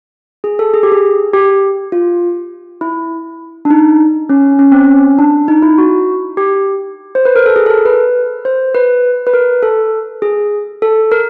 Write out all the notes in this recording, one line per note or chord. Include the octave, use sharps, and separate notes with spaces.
G#4
A4
G#4
G4
G#4
G4
F4
E4
D4
D#4
C#4
C#4
C4
C#4
D4
D#4
E4
F#4
G4
C5
B4
A#4
A4
G#4
A4
A#4
B4
C5
B4
B4
A#4
A4
G#4
A4
A#4